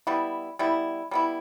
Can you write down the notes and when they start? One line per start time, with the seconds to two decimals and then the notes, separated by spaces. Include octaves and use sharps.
0.07 G3 B3 E4
0.59 G3 B3 E4
1.11 G3 B3 E4